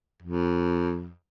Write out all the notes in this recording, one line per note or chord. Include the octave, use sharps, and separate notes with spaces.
F2